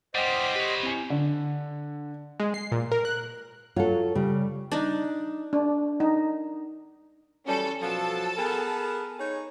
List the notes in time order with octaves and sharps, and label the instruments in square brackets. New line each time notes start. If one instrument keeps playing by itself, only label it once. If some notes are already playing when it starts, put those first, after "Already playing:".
[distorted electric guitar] E2 G3 [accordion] C5 D#5 D6 [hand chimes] F#5 G5
[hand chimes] G4 [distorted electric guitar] B4 C#5
[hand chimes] C4 E4 G#5
[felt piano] D3
[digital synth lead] G#3
C7
A#2
A#4
F#6
[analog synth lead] F#3 [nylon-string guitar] F4 A4
[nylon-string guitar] C#3 [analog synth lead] G3
[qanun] D4 D#4
[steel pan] D4
D#4
[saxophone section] E3 F#3 G3 [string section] C#4 A4
[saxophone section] B2 F3 F#3 [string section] A4 A5
[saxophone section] B3 G#4 A#4
D#4 G#4 C#5